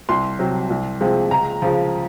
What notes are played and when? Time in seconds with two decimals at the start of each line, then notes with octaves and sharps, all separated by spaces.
0.09 C2 C6
0.39 C3 F#3
0.70 C2
1.01 C3 F3 G#3
1.31 C#2 A#5
1.62 C#3 F3